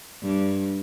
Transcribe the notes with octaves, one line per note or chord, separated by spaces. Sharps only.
G2